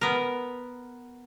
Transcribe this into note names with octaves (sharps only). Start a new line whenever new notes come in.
B3 A#4